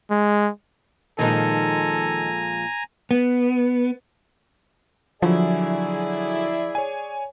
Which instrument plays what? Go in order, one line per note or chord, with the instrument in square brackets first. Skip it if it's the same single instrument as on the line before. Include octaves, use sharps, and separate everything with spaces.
[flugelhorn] G#3
[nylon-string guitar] A#2 F3 G#3 [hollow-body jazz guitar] D#3 D#4 [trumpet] A4 [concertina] G#5 A#5
[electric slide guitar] B3
[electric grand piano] D3 F#3 [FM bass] F3 [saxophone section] E4 [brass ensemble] G#4 D5
[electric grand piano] C#5 G#5